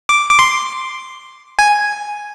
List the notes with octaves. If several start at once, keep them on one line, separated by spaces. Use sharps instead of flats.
D6
D6
C6
G#5